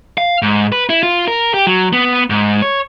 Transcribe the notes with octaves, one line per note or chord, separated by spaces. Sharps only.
F5
G#2
B4
E4
F4
A#4
G4
F#3
B3
G#2
C#5